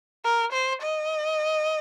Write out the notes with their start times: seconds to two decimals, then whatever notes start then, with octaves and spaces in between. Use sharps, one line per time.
0.25 A#4
0.52 C5
0.82 D#5